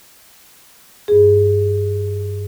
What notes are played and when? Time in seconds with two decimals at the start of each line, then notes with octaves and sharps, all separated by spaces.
1.08 G2 G#4